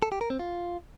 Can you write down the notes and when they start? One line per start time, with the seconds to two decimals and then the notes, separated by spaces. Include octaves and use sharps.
0.02 A4
0.12 G4
0.21 A#4
0.30 C4
0.39 F4